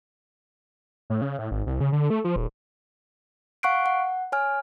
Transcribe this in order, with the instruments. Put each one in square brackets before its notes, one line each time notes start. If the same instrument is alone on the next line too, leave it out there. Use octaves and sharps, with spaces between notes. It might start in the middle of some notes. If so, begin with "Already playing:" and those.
[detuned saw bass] A2
C#3
A2
G#1
C2
C#3
D3
A3
F3
D#1
[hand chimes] F5 F#5 C#6 F#6 C7 D7
F#5
C#5 G#5 F6